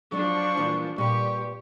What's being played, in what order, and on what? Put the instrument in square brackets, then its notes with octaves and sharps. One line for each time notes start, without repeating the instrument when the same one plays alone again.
[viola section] F3 D4 [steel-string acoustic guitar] F#3 D5 [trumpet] C#6
[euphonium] A#2 [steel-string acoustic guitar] E3 G3 F4
[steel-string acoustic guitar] A#2 B4 [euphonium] G3 [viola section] G4 [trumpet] C#6